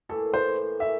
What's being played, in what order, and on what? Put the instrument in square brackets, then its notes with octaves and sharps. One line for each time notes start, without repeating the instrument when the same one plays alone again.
[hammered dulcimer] A2 E3 A#3 [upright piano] A4
[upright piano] C5
[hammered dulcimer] A2 E3 A#3 [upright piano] E5